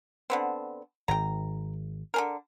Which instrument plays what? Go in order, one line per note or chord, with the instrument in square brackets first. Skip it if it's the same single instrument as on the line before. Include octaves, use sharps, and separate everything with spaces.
[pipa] D3 B3 C4
[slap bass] G#1 [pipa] G5 A#5
[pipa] D3 G#4 A#4